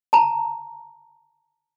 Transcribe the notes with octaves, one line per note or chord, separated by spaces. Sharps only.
A5 A#5